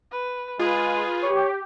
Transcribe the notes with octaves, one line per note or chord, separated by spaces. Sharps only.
B4
G#3 F4 G#4 B4
G4 C#5